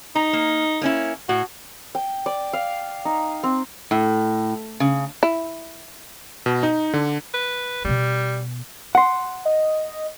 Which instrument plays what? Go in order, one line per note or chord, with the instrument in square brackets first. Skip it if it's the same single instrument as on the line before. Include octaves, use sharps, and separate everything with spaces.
[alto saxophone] D#4 [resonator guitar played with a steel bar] A#5
[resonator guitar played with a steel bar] A#3
A#3 C#4 E4
[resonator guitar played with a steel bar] A2 [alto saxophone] F#4
[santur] G5
D5
F5
D#4
C4
[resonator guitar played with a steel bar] A2
C#3
[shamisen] E4
[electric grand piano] B2
D#4
D3
[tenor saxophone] B4
[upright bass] B2 B3 [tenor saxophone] G3
[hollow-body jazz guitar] F#5 C6
[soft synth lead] D#5